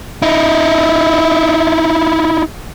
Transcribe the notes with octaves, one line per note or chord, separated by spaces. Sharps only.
D#4 E4